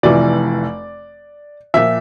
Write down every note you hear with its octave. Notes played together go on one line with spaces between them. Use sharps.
F1 F2 E3 D5
A#2 F3 E5